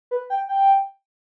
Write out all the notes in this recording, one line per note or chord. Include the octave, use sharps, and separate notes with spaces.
B4
G5
G5